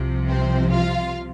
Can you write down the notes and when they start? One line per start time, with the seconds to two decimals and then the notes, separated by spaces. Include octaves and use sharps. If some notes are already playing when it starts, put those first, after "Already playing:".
Already playing: C2 C3 F3
0.28 C4 C5
0.73 F4 F5